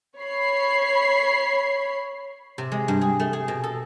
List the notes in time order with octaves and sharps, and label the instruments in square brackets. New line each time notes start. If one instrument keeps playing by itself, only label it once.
[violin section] C#5 B5 C7
[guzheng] C3
G#3
G2
G#4
A3
G#4
B2
A4